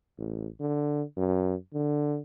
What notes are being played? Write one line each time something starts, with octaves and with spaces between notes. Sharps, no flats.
A1
D3
F#2
D3